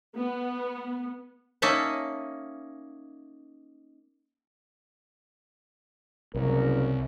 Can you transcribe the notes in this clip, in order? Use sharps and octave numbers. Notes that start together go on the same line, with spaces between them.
B3
A#3 C#4 D#4 E5 A5
F#1 C2 A#4